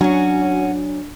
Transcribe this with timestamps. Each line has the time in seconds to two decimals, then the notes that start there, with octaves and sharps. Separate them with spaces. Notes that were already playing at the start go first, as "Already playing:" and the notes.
0.01 F#3 C#4 D4 F#4